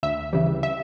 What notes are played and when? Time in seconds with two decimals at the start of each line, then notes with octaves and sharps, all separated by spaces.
0.03 D2 E5
0.33 C#3 E3 G3
0.63 E5